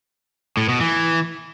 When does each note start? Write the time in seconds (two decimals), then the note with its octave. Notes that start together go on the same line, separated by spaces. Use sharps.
0.57 A2
0.69 B2
0.81 E3